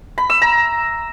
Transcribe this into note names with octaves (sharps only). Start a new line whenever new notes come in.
B5
E6
A#5